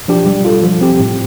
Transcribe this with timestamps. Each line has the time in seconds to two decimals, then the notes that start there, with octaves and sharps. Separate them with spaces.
0.08 F3 D4 G4
0.26 G3
0.45 F4 A4
0.63 F3
0.81 C4 G4
0.99 A2